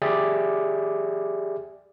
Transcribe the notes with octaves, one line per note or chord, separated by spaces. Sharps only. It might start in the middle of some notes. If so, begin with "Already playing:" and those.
G4 G#4 D5 E5